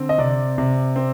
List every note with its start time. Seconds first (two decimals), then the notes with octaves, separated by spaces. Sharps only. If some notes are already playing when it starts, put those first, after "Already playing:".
Already playing: D3 C4
0.09 D#5
0.18 C3 D5
0.58 C3
0.96 C4